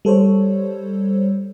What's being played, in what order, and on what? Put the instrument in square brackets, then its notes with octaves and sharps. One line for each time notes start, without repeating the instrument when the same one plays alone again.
[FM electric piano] G3 A4 C5 C#5